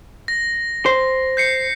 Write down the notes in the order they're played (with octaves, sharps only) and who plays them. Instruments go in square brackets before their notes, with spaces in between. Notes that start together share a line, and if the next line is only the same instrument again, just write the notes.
[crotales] A#6
[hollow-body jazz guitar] C5
[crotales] G6 C7 C#7